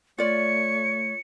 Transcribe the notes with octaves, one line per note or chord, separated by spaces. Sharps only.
A3 F4 C#5 D5 C#7